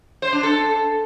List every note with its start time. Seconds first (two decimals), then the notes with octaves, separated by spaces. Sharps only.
0.22 C5
0.33 D4
0.43 A4